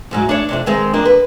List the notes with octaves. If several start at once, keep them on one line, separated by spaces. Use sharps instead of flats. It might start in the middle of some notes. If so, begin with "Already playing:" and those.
D2 G#2 F#3
D4 C#5
F2 C3 D4
D#3 G#3 C4
F2 A#3 D4
B4